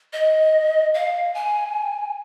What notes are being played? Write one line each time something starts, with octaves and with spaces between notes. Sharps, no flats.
D#5
F5
G#5